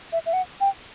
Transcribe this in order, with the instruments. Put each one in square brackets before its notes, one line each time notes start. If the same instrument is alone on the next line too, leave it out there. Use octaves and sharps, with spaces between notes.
[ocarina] E5
E5
F#5
G5